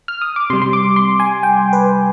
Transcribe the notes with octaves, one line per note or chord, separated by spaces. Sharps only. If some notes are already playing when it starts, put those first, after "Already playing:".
F6
D#6
D6
C3 G3 C6
C6
D6
C6
G#5
G5
B4